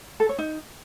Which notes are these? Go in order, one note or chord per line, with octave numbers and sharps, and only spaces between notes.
A4
C#5
D#4